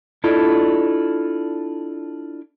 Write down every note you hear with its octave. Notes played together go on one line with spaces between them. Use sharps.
D4 E4 F4 A4 D5 D#5